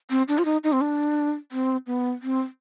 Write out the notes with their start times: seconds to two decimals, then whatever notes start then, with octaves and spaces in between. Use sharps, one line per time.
0.10 C4
0.28 D4
0.38 F4
0.45 D#4
0.64 D#4
0.72 C4
0.81 D4
1.52 C4
1.87 B3
2.23 C4